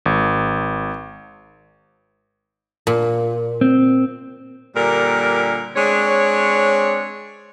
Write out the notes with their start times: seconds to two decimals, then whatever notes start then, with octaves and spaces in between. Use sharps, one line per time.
0.06 G#1
2.87 A#2
3.61 C4
4.76 A#2 D3 G3 A#4
5.76 G#3 C4 D4 C#5